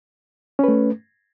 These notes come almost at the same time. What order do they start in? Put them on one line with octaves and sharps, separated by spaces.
C#4 B4 A3